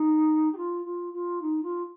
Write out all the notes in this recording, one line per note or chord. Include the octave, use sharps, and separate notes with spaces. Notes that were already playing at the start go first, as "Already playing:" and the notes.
Already playing: D#4
G4
F4
F4
F4
D#4
F4